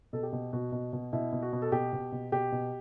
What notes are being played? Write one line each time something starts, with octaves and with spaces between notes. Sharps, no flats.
B2 A4
G4
B2
B2 F#4
B2
B2
B2 E4
B2
F#4
B2
A4
B2 G4
B2
B2
B2 G4
B2